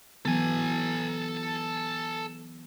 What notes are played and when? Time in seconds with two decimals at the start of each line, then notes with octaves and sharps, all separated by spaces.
0.25 E3 F#3 B3 A4 G#5